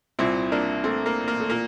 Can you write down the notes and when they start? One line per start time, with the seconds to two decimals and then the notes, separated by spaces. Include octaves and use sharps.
0.19 C2 A#2 C4 E4
0.52 A#3 D4
0.84 A3 C4
1.06 A#3
1.28 A#3
1.40 A3
1.50 A#2 A#3